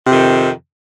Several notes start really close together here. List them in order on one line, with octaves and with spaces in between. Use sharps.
C3 F2 D#3